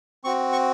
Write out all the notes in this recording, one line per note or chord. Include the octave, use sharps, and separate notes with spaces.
C4 F#4 C#6
C#6